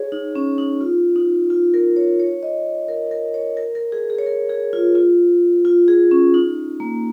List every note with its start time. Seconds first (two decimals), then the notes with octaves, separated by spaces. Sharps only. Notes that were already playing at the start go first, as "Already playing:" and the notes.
Already playing: G#4 C#5
0.12 D#4
0.35 C#4
0.58 D#4
0.81 F4
1.16 D#4
1.50 F4
1.74 A#4
1.96 C#5
2.20 C#5
2.43 D#5
2.88 A#4
3.11 A#4
3.34 C#5
3.57 A#4
3.75 A#4
3.92 G#4
4.10 G#4
4.18 C#5
4.26 A#4
4.49 G#4
4.73 F4
4.95 F4
5.65 F4
5.88 G#4
6.11 C#4
6.34 D#4
6.80 A#3